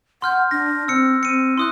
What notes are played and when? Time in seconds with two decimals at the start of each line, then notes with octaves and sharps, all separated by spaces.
0.22 F#5 C6 F6 G6
0.51 D4 A#6
0.88 C4 E6 C#7
1.23 C4 C#7 D#7
1.58 E4 C6 D#6 F#6